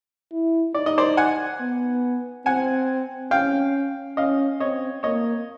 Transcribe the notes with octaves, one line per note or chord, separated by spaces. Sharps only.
E4
D#4 D5
D#5
C5 D5
F#5 G#5
B3
C4 F#5 G#5
C#4 F5 G5
C#4 D#5 F5
C4 C#5 D#5
A#3 C#5 D#5